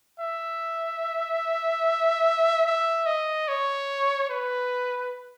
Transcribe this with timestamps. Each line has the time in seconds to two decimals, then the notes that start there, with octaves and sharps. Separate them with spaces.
0.20 E5
2.66 E5
3.06 D#5
3.48 C#5
4.29 B4